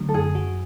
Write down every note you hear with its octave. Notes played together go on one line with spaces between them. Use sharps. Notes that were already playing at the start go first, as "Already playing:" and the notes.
Already playing: D3 F#3 A3
A4
F#2 G#4
F#4